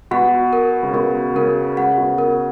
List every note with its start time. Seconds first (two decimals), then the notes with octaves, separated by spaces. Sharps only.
0.11 B2 F#5
0.53 A#4
0.83 C#3
0.93 B2 A#4
1.35 C#3 A#4
1.77 C#3 F#5
1.98 B2
2.18 A#4